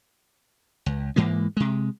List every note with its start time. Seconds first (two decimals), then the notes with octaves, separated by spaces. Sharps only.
0.86 C#2
1.16 G#2 E3 G#3 A#3
1.57 C3 G#3